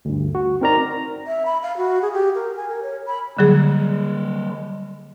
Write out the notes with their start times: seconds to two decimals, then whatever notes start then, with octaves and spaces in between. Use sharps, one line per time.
0.05 D2 G2
0.35 F#4
0.61 C4 D#4 A#4 D5 A#5
1.27 E5
1.46 B5
1.63 F5
1.77 F#4
2.02 G#4
2.13 G4
2.35 A#4
2.57 G#5
2.69 A#4
2.83 C#5
3.06 B5
3.38 D3 F#3 G3 A#3 G#4